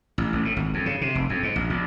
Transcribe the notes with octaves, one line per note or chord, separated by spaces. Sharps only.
A1
A1
A2
G#1
F2
C#3
C3
F1
F2
G#2
A#1
A#1